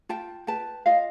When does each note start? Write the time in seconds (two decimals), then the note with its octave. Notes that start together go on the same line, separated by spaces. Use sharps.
0.09 F4 G5 A5
0.47 B4 G5 A5
0.86 F4 D#5 F5